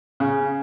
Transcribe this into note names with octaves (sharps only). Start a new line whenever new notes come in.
C#3